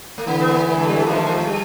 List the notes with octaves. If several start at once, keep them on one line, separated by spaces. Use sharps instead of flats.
A3
D3 E3 A#3
B3
A3
A#3
D3 E3 A#3
G#3
G3
G#3
D#3 F3 A3
G#3
A3
G#3
G3